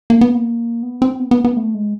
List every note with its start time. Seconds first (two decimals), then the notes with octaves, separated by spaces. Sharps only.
0.10 A#3
0.21 B3
0.34 A#3
0.83 B3
1.02 C4
1.20 B3
1.31 B3
1.45 B3
1.57 A3
1.75 G#3